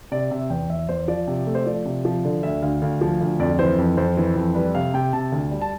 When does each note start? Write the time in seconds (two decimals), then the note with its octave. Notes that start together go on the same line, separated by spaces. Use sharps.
0.12 C3 D5
0.31 C3 E5
0.50 E2 G5
0.69 E2 E5
0.89 E2 C5
1.08 F3 D5
1.28 C3
1.47 A3
1.55 C5
1.66 F3 D5
1.85 C3
2.05 F3
2.25 D3
2.43 D2 E5
2.62 D2 F5
2.82 D2 F5
3.01 F3
3.21 D2
3.39 F2 D5
3.59 E3 C5
3.78 F2
3.97 F2 C5
4.17 E3
4.36 F2
4.55 G3 B4
4.75 C3 F5
4.94 C3 G5
5.13 C3 A5
5.32 D2
5.51 G3
5.61 A5